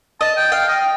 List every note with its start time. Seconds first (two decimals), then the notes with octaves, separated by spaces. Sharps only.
0.21 D#5 A5
0.37 G5
0.52 F5 G5
0.68 D#5